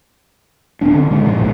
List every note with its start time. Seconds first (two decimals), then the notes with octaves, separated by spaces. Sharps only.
0.81 D1 B3 C4 D4
0.94 D3
1.11 B2 D3 G#3 A#3
1.26 G1 A#2 F3
1.40 C#2 G#2 A#3